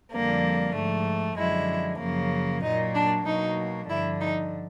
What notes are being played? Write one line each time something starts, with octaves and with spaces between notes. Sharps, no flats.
F2 D3 G3 A#3
G#2 F3 A3
F#2 D3 F3 G#3 E4
F#2 C#3 F3 A#3
A#2 F#3 A#3 D#4
D4
B2 F#3 A#3 D#4
G2 D3 F3 E4
D#4